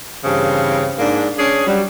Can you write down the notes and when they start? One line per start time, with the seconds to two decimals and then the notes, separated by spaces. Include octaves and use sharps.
0.24 G2 C#3 E3 C4
0.99 G#2 A#3 D4
1.38 C#4 D4 G#4
1.67 F#3 G3